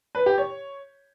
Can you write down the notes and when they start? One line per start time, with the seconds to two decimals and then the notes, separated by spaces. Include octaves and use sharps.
0.15 B4
0.26 G4
0.38 C#5